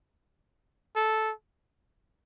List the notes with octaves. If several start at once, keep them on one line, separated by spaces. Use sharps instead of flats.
A4